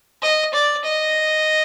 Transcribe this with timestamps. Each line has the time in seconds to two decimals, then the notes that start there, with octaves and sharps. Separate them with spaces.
0.22 D#5
0.54 D5
0.84 D#5